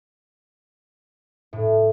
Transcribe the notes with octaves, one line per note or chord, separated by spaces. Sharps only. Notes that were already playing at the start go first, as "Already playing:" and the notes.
A2